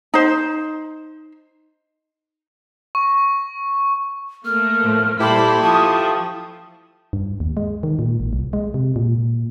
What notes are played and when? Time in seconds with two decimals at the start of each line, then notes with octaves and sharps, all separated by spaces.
0.14 D#4 C5
2.95 C#6
4.45 A3 A#3 F6
4.83 A2 F3
5.20 A#2 G3 E4 G4 A4 C5 B5 D6
5.63 F3 A5 C#6 D#6
7.13 G2
7.40 D#2
7.57 G#3
7.83 D#3
7.99 A#2
8.20 A1
8.33 C2
8.53 G#3
8.74 C3
8.96 A#2